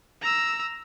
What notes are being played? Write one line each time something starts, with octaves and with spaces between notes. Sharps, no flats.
A#5 E6